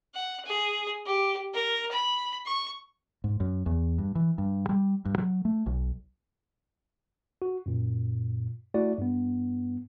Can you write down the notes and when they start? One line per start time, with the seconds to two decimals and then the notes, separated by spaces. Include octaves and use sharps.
0.14 F#5
0.45 G#4
1.06 G4
1.53 A#4
1.91 B5
2.46 C#6
3.24 G#2
3.40 F#2
3.66 E2
3.98 G2
4.15 E3
4.38 G2
4.69 G3
5.05 G2
5.18 F#3
5.45 A3
5.66 B1
7.42 F#4
7.66 F#2 A#2
8.74 A3 E4 F#4 D5
8.98 G2 B3